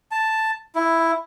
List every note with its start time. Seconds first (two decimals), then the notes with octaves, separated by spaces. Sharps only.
0.11 A5
0.75 E4